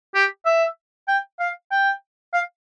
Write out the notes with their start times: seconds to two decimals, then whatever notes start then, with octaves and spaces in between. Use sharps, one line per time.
0.15 G4
0.45 E5
1.08 G5
1.40 F5
1.71 G5
2.34 F5